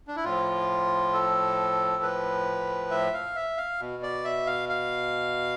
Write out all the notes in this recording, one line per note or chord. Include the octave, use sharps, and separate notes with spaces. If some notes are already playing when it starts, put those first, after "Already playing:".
D4
E4
A2 F3 F4
A4
B4
E5
F5
E5
F5
B2
D5
E5
F5
F5